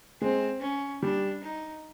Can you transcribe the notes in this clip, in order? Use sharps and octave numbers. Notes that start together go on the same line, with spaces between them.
G#3 C4
C#4
G3 D4
D#4